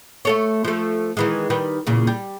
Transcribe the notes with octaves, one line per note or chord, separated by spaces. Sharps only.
A3 A4 C#5
F3 A3
D#3 E3 G#3
D#3 G3 B4
E2 A#2 C#3
G3